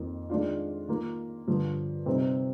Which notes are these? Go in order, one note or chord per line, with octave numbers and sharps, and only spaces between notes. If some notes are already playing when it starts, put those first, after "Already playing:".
Already playing: F2 D#3 A#3
D#3 G#3 D4 F4
D#3 A#3 F4
G2 D3 F3
C3 G3 C4 D#4